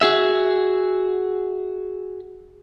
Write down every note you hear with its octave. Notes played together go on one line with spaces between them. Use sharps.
F#4 G#4 E5